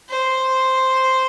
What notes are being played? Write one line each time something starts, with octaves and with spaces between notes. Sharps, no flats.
C5